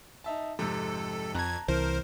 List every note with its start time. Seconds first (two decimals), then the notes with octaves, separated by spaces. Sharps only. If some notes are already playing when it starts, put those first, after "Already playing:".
0.24 D#4 E5 A5
0.59 F2 G#2 C3 A4
1.35 F2 A5 A#5 F#6 G#6
1.68 C2 E3 A#4 C5